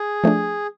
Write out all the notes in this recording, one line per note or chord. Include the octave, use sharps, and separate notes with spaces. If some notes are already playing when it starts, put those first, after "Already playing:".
Already playing: G#4
F3 A3 D4